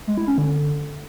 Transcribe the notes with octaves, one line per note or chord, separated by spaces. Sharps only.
G#3
E4
C#4
D3